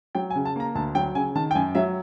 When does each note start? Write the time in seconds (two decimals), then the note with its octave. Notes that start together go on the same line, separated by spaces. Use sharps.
0.15 F#3 G5
0.30 G#5
0.35 C#3
0.45 A5
0.56 A#3 A#5
0.75 D2 A5
0.95 F#3 G5
1.15 C#3 G#5
1.35 D#3 A5
1.51 G5
1.55 F#2 G#5
1.75 F#3 E5